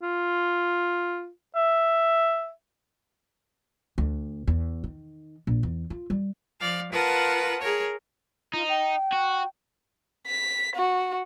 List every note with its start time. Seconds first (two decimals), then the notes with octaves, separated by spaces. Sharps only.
0.03 F4
1.55 E5
3.98 D2
4.47 E2
4.84 D#3
5.47 A#1
5.63 E2
5.90 F4
6.10 G3
6.60 F3 D5 F5
6.92 F4 A#4 B4 F#5 A5 D#6
7.61 G#4 A#4 C#5
8.53 D#4 F4
8.69 G5
9.12 F#4
10.27 B6
10.76 F#4